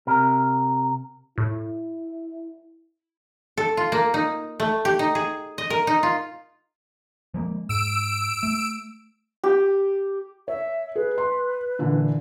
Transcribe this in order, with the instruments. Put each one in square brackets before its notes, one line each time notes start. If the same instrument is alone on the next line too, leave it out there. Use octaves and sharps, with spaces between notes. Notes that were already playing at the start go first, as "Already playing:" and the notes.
[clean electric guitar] C3 A#4
[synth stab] A2 [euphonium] E4
[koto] A4
F4
A#3
D#4
A3
G4
D#4
G#4
D#5
A#4
D#4
F4
[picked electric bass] F3 G#3 A#3
[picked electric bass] G#2 [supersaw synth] E6 D7
[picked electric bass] A3
[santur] G4
[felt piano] C#5 [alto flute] E5
[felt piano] G#4 [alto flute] B4
[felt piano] C6
A#2 D3 E3